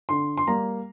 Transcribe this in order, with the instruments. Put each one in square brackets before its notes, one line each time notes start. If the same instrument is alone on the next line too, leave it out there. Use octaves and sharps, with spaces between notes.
[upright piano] D3 C6
C6
G3 A#3 A#5